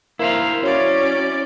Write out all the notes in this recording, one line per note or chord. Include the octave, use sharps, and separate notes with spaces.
A#3 E4 C5 F5
F#3 C#4 D5